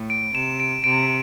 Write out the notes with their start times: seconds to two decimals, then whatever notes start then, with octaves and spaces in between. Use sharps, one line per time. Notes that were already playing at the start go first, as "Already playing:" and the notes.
Already playing: A2
0.10 D7
0.35 C3 E7
0.60 D7
0.84 C3 D7